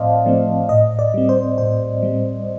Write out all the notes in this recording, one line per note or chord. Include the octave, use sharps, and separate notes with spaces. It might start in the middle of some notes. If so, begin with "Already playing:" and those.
Already playing: A2 F3 C4 C5 D5 D#5 F5 A5
F3 A3 C4
A2 D#5
D5
G3 C4
C5
A2 C5
G3 C4